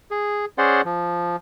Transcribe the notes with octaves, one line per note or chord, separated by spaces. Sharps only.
G#4
C#4 G#4 C5 D5 F#5 C6
F3